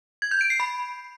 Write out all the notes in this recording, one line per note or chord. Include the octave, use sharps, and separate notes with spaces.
G#6
G6
D7
C7
B5